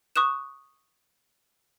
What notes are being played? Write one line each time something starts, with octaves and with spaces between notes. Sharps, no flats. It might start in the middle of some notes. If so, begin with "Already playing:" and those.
C#6 D#6 F#6 E7